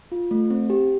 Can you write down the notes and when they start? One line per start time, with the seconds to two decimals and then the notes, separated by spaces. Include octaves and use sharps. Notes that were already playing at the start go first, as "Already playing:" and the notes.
0.12 F4
0.31 A3
0.50 C4
0.70 G4